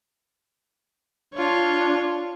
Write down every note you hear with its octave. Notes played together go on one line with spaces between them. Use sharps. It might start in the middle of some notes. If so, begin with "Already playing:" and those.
D4 F4 C#5